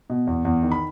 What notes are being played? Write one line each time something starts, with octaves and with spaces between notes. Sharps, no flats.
B2
E2
E2
D#3
B5